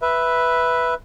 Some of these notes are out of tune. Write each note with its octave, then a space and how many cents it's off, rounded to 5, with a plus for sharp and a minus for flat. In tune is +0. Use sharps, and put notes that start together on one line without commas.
B4 +0 E5 +0